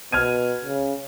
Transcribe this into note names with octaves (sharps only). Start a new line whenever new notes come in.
B2 F6 G#6 D#7
C#3